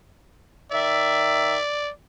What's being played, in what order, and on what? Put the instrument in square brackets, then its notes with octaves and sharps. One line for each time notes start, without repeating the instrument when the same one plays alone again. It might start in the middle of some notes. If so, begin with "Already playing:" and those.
[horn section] D#3 E5 [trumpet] D5